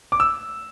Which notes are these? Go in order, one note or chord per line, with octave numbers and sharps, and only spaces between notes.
D6
E6